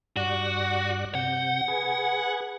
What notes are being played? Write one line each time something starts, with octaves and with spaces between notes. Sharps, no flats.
G2 F#4 D5 F#6
C3 F#5 G6
G#4 B4 G#5